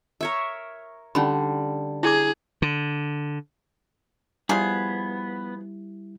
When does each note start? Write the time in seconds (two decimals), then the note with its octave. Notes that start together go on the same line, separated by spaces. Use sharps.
0.21 A#4 C#5 E5
1.15 D3 G3 C#4 D#4 B5
2.03 E4 G#4 D6
2.62 D3
4.49 F3 G3 B3 E4 G#4